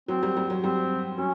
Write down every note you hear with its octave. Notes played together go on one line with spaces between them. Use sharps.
F#3 C4
G3
G3
F#3
G3 C4
F#3 C#4